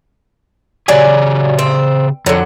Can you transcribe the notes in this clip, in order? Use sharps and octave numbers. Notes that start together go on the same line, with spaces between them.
C#3 F#3 G4 G#4 D5 G#5
C4
F2 D3 F#3